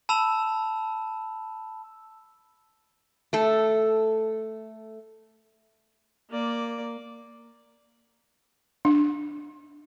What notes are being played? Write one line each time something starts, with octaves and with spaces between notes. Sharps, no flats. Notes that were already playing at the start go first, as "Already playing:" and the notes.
A5 B5 E6 E7 F7
A3 A4
A#3 D5
D4